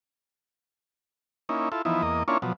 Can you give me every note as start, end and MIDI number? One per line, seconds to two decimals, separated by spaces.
1.49 1.69 58
1.49 1.69 61
1.49 1.69 63
1.49 1.69 64
1.72 1.82 64
1.72 1.82 65
1.72 1.82 69
1.85 2.02 52
1.85 2.02 53
1.85 2.02 59
1.85 2.02 63
1.85 2.02 64
2.02 2.23 40
2.02 2.23 58
2.02 2.23 75
2.28 2.38 58
2.28 2.38 61
2.28 2.38 62
2.28 2.38 64
2.28 2.38 65
2.28 2.38 73
2.42 2.53 47
2.42 2.53 53
2.42 2.53 54